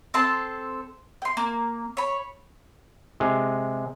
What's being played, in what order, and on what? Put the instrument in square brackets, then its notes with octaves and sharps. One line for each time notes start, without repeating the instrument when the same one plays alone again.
[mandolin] C4 A4 A5 C6
G5 C6
A#3
C#5 B5
[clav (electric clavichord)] C3 G#3